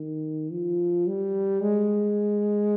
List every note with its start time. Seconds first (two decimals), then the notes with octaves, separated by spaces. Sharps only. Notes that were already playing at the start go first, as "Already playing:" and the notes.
Already playing: D#3
0.51 F3
1.07 G3
1.62 G#3